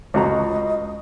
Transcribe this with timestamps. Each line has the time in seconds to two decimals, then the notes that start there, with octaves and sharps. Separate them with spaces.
0.14 C#2 F#4 D#5 A#5